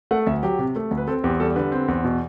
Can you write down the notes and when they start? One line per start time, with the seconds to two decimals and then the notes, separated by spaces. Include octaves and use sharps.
0.11 A3 F#5
0.27 D2 E5
0.43 F#3 G4
0.59 C3
0.76 A3
0.91 D2
0.97 B4
1.08 C4 A4
1.24 E2 G4
1.40 G3 A4
1.56 D3 B4
1.72 C4
1.88 E2
2.04 B2